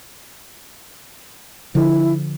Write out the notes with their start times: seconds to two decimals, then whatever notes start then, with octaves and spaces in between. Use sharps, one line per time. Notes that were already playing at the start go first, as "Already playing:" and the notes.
1.75 D3 F3 E4